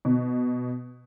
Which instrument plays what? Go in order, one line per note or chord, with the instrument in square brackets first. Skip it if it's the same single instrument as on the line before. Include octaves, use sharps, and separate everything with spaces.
[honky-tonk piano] B2